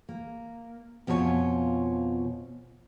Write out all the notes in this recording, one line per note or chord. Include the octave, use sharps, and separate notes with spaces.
A#3
F2 B2 F4 A4 C#5 G#5